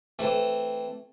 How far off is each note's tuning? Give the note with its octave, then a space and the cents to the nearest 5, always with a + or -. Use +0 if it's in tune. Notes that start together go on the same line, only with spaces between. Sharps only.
E3 +0 A3 +0 C4 +0